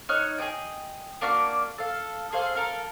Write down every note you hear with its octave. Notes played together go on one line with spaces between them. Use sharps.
D#4 C#5 F6 F#6
G#4 A4 D#5 G5
A#3 D4 F#4 F6
A4 F5
G#4 A4 C5 F5
A4 A#4 F5